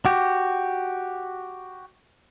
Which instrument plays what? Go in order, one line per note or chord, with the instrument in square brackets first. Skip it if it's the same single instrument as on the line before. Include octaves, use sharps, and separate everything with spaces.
[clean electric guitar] F#4 G4